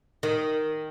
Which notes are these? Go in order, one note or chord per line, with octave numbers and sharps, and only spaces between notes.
D#3